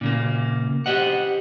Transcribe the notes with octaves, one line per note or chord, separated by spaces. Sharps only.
A#2 C#3 A#3
G4 C5 D#5 F#5